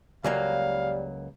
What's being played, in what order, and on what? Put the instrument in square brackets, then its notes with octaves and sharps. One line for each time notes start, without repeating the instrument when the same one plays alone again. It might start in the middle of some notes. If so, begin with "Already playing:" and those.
[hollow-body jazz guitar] C#2 F#3 A#3 [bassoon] G3 [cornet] F5